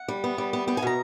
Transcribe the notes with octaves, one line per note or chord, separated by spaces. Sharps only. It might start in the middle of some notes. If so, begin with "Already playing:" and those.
Already playing: F#5
G3
B3
G3
B3
B3 G5
G#5
B2 A#5